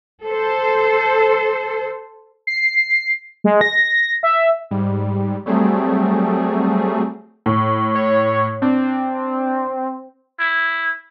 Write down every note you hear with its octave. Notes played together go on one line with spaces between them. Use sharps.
A4 C5
C7
G#3
A#6
E5
G#2 G3
F#3 G3 A3 C4 G#4
A2
C#5
C4 D4
E4